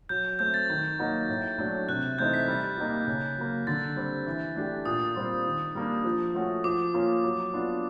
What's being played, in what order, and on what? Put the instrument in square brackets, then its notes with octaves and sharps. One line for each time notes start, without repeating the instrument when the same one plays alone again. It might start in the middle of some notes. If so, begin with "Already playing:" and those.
[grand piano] F#3 [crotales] G6
[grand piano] A3 C4 [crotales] G6
[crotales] A6
[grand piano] D#3 [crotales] G6
[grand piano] F#3 A#3 D#4 F#4
A2
F#3 A3 D4
[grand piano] C3 [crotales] F#6
[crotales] F#6
[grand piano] E3 A3 C4 D#4 [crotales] G6
[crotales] B6
[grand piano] G3
A#3 D#4 G4
C#3
F#3 A#3
[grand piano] D3 [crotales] A6
[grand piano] G3 C4
E3
A3 D4 G4
[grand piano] A#2 [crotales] D#6
[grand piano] G3 C4 F4
D#3
G3 A#3 D4
F3
A3 C#4 F#4
[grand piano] F3 [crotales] D6
[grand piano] A#3 C#4 F4
F#3
B3 D4 F4